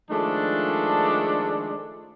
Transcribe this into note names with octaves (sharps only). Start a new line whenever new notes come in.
D#3 F3 G#3 A3 D4